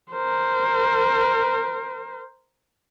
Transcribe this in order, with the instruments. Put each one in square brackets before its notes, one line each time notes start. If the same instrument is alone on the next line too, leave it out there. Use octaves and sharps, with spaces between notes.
[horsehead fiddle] A#4 C5